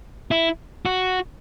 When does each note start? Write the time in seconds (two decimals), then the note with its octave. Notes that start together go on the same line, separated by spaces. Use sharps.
0.31 E4
0.85 F#4